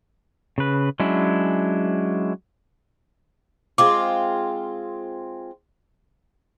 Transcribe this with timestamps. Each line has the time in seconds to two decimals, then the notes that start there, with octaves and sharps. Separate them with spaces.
0.58 C#3 B4
1.00 F#3 G#3 C#4 D4 E4
3.78 G#3 C4 F4 D6